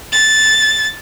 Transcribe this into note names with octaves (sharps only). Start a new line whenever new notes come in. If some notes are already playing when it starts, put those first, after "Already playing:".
A6